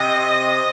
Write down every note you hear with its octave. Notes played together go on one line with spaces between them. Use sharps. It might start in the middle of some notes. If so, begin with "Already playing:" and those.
Already playing: C3 C4 D#5